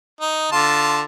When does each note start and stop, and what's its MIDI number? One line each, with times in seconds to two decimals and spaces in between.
0.21 0.50 63
0.52 1.02 50
0.52 1.02 65
0.52 1.02 81